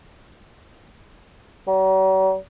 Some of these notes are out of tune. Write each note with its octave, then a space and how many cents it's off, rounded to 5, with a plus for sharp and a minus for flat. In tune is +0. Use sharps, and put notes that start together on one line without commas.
F#3 +45